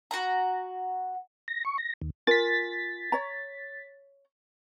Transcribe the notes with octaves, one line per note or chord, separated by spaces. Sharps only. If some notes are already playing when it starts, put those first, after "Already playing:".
F#4 F#5 A#5
A#6
C#6
A#6
D#2
F4 A#4 G#5 A6 B6
C#5 A#5